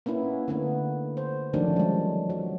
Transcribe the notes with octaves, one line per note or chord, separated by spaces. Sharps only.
A#3 B3 C#4 E4
D3 A3 B3
C5
D#3 F3 F#3 A3 C#4 D4
G3 G#3
F#3